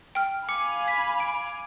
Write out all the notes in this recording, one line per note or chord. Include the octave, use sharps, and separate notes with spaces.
G5 F6
F5 G#5 B5 D6 C#7
B6
D7